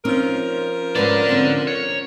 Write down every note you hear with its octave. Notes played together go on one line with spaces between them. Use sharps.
F3 C4 C#4 D#4 A#4
G#2 D3 C#4 B4 D5
C4 C#4
C#5